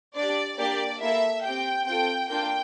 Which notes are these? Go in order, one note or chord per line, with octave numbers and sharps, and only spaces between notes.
D4 G4 D5
A#3 D4 G4 D5
A#3 E4 A4 E5
C4 G4 G5
C4 F4 A4 G5
A#3 D4 F4 G5